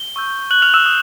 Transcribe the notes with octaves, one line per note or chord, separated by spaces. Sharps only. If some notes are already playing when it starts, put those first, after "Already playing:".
Already playing: G7
C#6 E6 G6
F#6 F#7
F6 F7
E6 E7
D#6 G6